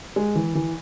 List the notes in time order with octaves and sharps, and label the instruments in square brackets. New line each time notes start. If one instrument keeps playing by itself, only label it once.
[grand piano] G#3
E3
E3